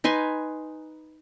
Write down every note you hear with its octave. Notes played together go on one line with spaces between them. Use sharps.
D#4 B4 G#5 C6